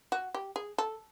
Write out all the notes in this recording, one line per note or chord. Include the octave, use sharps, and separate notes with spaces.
F#4
G4
G#4
A4